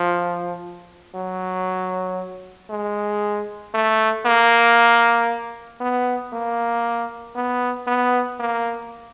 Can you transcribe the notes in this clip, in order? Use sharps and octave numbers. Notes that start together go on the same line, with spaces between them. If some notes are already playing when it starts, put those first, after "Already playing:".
Already playing: F3
F#3
G#3
A3
A#3
B3
A#3
B3
B3
A#3